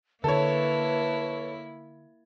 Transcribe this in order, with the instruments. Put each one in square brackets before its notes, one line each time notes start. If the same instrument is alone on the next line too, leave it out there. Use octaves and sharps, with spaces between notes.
[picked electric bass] D3 [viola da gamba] A#3 E4 [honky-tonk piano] A4 C#5 [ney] B4